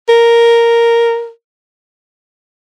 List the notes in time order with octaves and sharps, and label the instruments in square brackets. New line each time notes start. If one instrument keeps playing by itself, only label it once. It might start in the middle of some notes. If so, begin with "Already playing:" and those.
[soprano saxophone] A#4